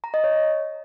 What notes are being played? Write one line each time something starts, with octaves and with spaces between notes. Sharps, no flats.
A#5
D#5
C#5